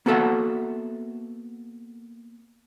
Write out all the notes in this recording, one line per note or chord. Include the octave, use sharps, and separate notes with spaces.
A#3 B3 F#4 A4 E5 F#5